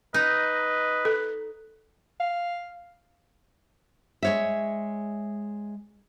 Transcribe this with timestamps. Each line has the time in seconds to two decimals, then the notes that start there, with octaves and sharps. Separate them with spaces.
0.14 D#4 B4 D#5
1.05 A4
2.20 F5
4.23 G#3 C#5 E5